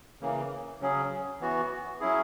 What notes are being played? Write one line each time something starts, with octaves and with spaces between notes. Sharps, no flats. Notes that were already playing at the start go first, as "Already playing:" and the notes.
C#3 E3 A#3
C#3 F#3 C#4 G#4
E3 B3 F#4
F#3 C#4 E4 G#4